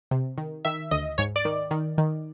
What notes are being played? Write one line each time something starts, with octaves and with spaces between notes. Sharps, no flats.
C3
D#3
D#3 E5
D2 D#5
G#2 C#5
D5
D#3
D#3
D#3